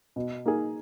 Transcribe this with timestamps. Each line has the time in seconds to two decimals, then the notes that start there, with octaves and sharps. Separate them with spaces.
0.16 B2
0.46 A#3 D#4 G#4